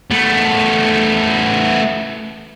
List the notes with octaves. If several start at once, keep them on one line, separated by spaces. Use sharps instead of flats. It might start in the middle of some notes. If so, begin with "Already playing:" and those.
A3 B3